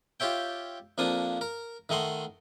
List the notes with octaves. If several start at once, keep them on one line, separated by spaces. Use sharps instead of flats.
F4 G4 C#5 E5 G5
F2 F3 A#3 D4 D#6
A#4
D#3 A3 D#5 F#5 C6